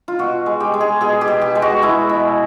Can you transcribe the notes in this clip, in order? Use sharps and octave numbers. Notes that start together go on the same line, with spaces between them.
F4
B2 F#4
G#3
G4
G#3
G#4
B2 G#4
G4
B2
G4
G#3
F#4
G#3 E4
B2